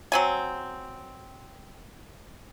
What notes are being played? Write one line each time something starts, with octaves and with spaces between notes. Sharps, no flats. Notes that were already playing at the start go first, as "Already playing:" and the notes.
F#3 C4 G#5